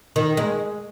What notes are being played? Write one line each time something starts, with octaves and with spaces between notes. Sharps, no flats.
D#3
G#3